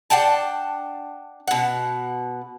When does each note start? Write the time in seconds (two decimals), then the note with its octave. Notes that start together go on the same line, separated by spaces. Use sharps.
0.10 D4 F#5 G5 A5
1.48 B2 F#5